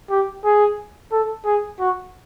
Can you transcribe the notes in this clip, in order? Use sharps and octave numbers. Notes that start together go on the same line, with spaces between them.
G4
G#4
A4
G#4
F#4